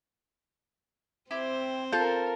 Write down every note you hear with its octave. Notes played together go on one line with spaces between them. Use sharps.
C4 E4 G4 C5 D6
F4 A4 A#4 A5 G6